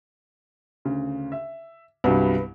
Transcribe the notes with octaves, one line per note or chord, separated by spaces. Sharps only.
D2 C#3
E5
C2 G2 F#3 B3